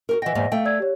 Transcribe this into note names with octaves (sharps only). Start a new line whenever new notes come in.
F#4 G4 A#4
E3 D#5 F#5 G5 A#6
E2 G#2 A#3
A3 F5 G5
D5 E6 G#6
G4 C#5